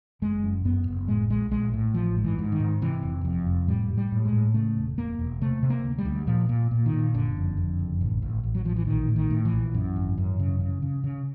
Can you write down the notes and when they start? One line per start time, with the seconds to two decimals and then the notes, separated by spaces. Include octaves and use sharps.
0.22 F#1 G#3
0.43 F#2
0.65 F#2 B3
0.87 F#1
1.08 A2 G#3
1.30 A#1 G#3
1.51 A#1 G#3
1.74 A2
1.94 A1 F3
2.17 G#2
2.24 E3
2.39 G#2
2.52 D#3
2.60 G#2
2.82 C3 E3
3.03 F1
3.25 F2
3.47 F1
3.67 A2 G3
3.90 A2
3.98 G3
4.12 A2
4.25 G#3
4.32 A2
4.54 C#3 A3
4.77 E1
4.98 E1 A#3
5.19 E1
5.41 C3 A3
5.63 C3
5.70 A#3
5.84 D2
5.98 G3
6.05 D2
6.27 A#2 F3
6.49 A#2
6.71 A#2
6.86 D#3
6.93 A#2
7.14 F#1 D3
7.36 F2
7.57 F2
7.79 F#1
8.01 A1
8.22 A1
8.43 A1
8.55 F#3
8.65 A1 F3
8.76 E3
8.87 A#1 D#3
9.08 A2
9.16 D#3
9.31 A2
9.45 E3
9.52 A#1
9.74 F#2
9.96 G#1
10.18 F#2
10.39 C#3
10.60 C#3
10.82 C#3
11.04 C#3